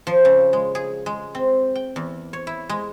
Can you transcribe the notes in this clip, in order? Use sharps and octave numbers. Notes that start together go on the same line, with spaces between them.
F3
C#3
G#3
G#4
G#3
C4
G5
E2
C#5
E4
G#3